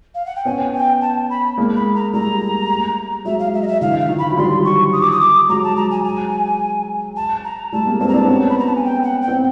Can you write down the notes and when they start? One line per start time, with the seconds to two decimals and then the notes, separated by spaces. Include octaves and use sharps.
0.14 F5
0.26 F#5
0.36 G5
0.45 B3 C#4 G#5
0.73 G5
1.01 A5
1.30 B5
1.58 G#3 A#3
1.76 B5
1.95 A#5
2.13 G3 A3 A#5
3.25 F#3 G#3 E5
3.39 F5
3.53 E5
3.62 D#5
3.67 E5
3.80 D3 E3 F5
4.00 F5
4.09 D#3 F3
4.18 B5
4.30 F#3
4.37 F3 G3 C6
4.65 C#6
4.93 D#6
5.01 D6
5.11 D#6
5.21 D6
5.49 F#3 G#3 A#5
5.63 A5
5.77 A#5
5.91 G#5
6.04 G#5
7.16 A5
7.44 A#5
7.72 G3 A3 A5
7.87 G#3 A#3
8.00 A#3 C4 A5
8.08 A#5
8.14 C4 D4 A5
8.28 B3 C#4
8.49 B5
8.58 A#5
8.67 A5
8.75 G#5
8.84 G5
9.03 F#5
9.21 G5
9.28 C4